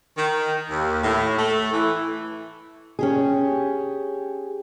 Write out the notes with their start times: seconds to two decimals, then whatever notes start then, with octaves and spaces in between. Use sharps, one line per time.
0.16 D#3
0.70 D#2
1.03 A2
1.38 A3
1.73 E3
2.99 C#4 G4 G#4